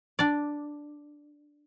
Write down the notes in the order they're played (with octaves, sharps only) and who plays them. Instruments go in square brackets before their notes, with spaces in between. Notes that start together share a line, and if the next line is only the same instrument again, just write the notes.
[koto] D4 D5